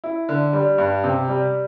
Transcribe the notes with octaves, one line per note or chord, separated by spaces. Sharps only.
E4
D3
G3
G2
C3
G3